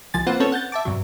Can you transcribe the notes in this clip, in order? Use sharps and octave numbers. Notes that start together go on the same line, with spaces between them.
C2 F3 G#5 A6
A#3 C4 F4 B4 C5 F#5
C4 C#4 A4 B4 C#5 A5
F#5 G6 A6
E5 A5 D6
G2 C3 F#3